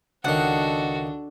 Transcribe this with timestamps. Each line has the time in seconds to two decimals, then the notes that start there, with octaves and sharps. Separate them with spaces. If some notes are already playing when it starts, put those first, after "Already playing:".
0.24 C#2 D#3 D4 F#4 A4 F#5